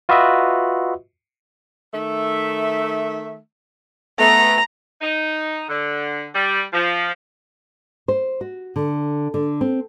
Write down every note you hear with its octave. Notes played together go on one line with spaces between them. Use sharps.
F4 F#4 B4 D#5 E5
D#3 A3 E5
A3 B3 A#5
D#4
D3
G3
F3
C5
F#4
D3
D3
C4